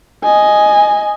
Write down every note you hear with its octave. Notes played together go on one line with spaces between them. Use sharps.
D#5 G#5